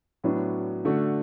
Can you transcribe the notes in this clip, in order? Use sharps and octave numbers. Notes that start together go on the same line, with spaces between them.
A2 F#3 B3 D4
D3 A3 D4 F#4